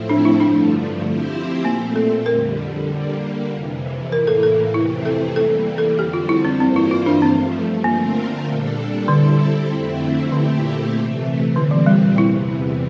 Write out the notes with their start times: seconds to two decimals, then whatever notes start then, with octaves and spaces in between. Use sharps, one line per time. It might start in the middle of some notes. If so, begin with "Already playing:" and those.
Already playing: A2 F3 A3 C4 E4
0.09 D4
0.25 E4
0.40 G2 D3 F3 A3 D4
1.03 F3 C4 E4 G4 C5
1.65 A#2 A3 A#3 C4
1.96 A4
2.26 F2 D3 G3 A#4
2.88 D3 G3 A#3
3.51 F2 C3 E3
4.12 A2 E3 A#3 A#4
4.27 A4
4.43 A4
4.74 F2 C3 E3 A3 C4 E4
5.05 A4
5.36 E3 G3 A#3 A4
5.78 A4
5.98 F2 D3 G3 C4 G4
6.13 F4
6.29 E4
6.45 C4
6.60 G2 E3 A#3 C4 F4 C5
6.76 E4
6.91 F4
7.06 D4
7.22 G2 F3 A3 C4
7.84 D3 A3 A#3 C4 F4 A#4
8.46 A#2 G3 D4 A4
9.08 D3 G3 C4 E4 A4
9.69 F2 D3 A3 C4 E4
10.32 A#2 D3 A3 C4 E4 G4
10.94 C3 E3 A3
11.56 A#2 D3 G3 C4
11.71 E3
11.86 G3
12.17 E2 C3 E3 E4